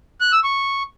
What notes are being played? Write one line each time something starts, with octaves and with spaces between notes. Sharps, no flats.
F#6
E6
C#6